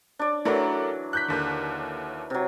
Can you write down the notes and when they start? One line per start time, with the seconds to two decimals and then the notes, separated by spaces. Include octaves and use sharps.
0.19 D4 D5
0.45 E3 F#3 A3 D4 A#4
1.13 F#6 G6 B6
1.28 D#2 D3
2.30 C3 F#3